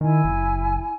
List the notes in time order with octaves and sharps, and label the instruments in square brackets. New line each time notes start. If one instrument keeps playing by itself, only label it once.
[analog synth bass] D#3 [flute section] E4 G#5
[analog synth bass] F#1